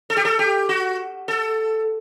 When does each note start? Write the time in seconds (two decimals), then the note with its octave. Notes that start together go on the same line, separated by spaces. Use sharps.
0.10 A4
0.17 G4
0.25 A4
0.39 G4
0.69 F#4
1.28 A4